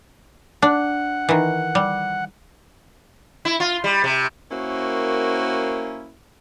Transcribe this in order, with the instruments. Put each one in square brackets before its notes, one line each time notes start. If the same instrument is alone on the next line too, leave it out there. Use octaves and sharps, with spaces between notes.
[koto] D4 [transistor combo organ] F#5
[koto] D#3 E3
G3
[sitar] E4
F4
G3
C3
[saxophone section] A#3 C#4 E4 F#4 A#4 C5